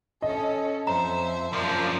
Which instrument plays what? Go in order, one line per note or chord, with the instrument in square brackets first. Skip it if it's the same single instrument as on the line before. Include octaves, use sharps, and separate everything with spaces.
[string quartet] C#4 A4 [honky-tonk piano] D#5
[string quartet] F2 C5 E5 [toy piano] A#5
[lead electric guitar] F#2 F3 [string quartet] A#4 D5 F5